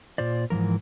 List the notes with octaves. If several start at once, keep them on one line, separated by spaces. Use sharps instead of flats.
A#2 F4 C5 D5
G#2 E3 F3 A#4